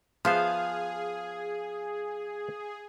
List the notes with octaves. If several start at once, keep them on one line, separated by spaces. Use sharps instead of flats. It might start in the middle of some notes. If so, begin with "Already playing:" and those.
F3 B3 G#4 C5 F5